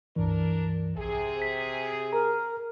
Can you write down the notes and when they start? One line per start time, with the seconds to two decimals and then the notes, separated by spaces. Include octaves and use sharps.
0.16 C#2 G2 E3 D4 A#4
0.97 A#1 C3 G#4
1.42 B6
2.13 A#4 A#5